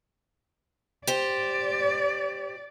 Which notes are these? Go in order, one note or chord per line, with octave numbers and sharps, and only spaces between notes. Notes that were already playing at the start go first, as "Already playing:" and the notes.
G4 C5 D5